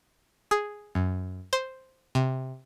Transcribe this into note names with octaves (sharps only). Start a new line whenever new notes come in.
G#4
F#2
C5
C3